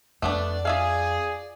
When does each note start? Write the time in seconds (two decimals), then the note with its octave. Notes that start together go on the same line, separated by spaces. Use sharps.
0.22 F2 A3 B3 C4 D4 D5
0.65 F4 G#4 E5 F5